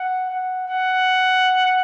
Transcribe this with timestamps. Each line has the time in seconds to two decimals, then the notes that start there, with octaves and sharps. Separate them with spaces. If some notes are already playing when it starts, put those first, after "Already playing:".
Already playing: F#5
0.30 F#5
0.68 F#5